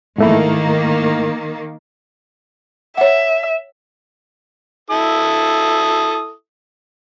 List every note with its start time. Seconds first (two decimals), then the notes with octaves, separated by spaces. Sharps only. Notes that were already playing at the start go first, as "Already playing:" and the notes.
0.18 G#2 D#3 A3 A#3 E4
2.97 C#5 E5 F#5
4.90 E4 A4 D#6